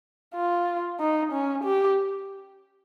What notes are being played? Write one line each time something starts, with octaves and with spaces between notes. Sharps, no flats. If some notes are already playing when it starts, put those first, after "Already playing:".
F4
D#4
C#4
G4